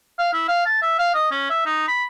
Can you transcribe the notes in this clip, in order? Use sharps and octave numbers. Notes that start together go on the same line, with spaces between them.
F5
E4
F5
A5
E5
F5
D#5
C#4
E5
D#4
B5